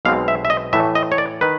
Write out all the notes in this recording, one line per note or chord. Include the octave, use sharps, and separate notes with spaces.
B1 B2 G#3 C4 F5
E5
E5
D#5
A2 E3 A3 E5
D#5
C#5
D5
D#3 B4